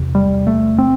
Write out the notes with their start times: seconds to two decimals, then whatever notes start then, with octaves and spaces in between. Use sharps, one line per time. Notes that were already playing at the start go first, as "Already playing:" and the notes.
Already playing: E2 C3
0.15 G3
0.47 A3
0.78 C4